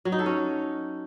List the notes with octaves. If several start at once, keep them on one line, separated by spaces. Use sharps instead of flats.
F#3
D#4
A4
C#4